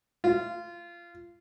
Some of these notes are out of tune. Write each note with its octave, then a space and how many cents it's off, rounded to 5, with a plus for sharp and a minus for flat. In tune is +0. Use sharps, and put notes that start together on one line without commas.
F4 -20